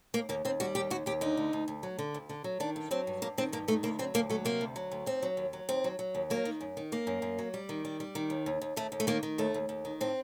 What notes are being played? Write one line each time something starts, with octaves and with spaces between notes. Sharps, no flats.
D#2 A#3
D#2 A#3
D#2 C4
G3 F#4
D#2 G4
D#2 F#4
D#2 G4
D3 D#4
D2
D2
D2
F#3
D3
D2
D3
F#3
D#3 D4
G2
F#3 C4
G2
G2 A#3
D#3 C4
G2 A#3
D#3 A3
D2 A#3
F#3 C4
D2 A#3
F#3 A3
C3 A#3
D2
F#3
D2
D#2 C4
F#3
D#2
F#3
D#2 C4
F#3
F#3
D#2
F#3 A#3
D#3
F#2
D#3
F#2 A#3
F#2
F#2
F#3
G3
D#3
G3
G3
D#3
D#2
D#2
D#2
D#2 A3
D#2
A3
D#3 A#3
D#3
D#2 A3
D#2
D#2
D#3
A2 C4